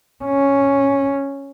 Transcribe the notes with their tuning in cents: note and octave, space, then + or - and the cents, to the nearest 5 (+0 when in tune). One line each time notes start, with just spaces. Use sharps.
C#4 +0